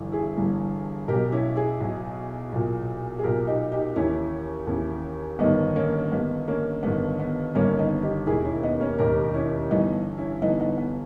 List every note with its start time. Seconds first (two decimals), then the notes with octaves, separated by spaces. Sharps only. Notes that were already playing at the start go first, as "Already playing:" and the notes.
Already playing: G1 G2 E3
0.12 E4 G#4
0.36 G1 G2 E3
1.08 B1 B2 G4 A#4
1.32 C#4 E4
1.56 E4 G#4
1.80 B1 B2
2.52 B1 A#2
3.19 G#4
3.24 B1 A#2 G4 A#4
3.47 D#4 G4
3.72 D#4 G4
3.96 D#2 C#3 E3 C#4 E4
4.67 D#2 C#3 E3
5.39 G1 G2 D#3 B3 D#4
5.76 A#3 C#4
6.12 G1 G2 D#3 B3
6.48 A#3 C#4
6.83 G1 G2 D#3 B3
7.20 B3
7.55 G1 G2 D#3 A#3 C#4
7.79 B3 D#4
8.03 D#4 G4
8.26 E1 D#2 D#3 E4 G#4
8.45 C#4 E4
8.63 B3 D#4
8.80 A#3 C#4
8.98 E1 D#2 D#3 G4 A#4
9.34 C#4 E4
9.70 G1 G2 E3 B3 D#4
10.18 C#4 E4
10.42 G1 G2 E3 B3 D#4
10.60 B3 D#4
10.78 B3